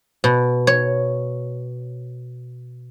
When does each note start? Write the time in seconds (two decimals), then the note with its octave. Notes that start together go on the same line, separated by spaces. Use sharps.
0.24 B2
0.67 C#5